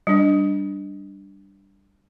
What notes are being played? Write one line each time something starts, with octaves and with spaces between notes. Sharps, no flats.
G3 D4